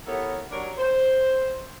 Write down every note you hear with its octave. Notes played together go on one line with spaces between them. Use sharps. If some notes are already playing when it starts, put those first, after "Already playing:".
B3 E4 G4 A4 A#4 C#5
F#3 D4 G4 A#4 C#5
C5